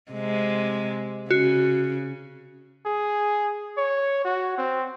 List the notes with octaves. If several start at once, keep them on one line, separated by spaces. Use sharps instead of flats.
C3 G#3
C#3 F#4
G#4
C#5
F#4
C4